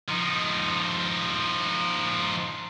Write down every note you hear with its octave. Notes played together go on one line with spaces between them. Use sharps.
F3 D#4